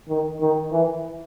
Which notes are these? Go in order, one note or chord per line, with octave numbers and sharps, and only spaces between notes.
D#3
D#3
E3